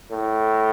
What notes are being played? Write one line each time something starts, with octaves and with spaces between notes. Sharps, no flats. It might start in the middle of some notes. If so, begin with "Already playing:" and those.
A2